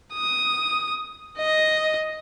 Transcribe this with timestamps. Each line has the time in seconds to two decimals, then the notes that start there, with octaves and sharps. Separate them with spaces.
0.14 D#6
1.39 D#5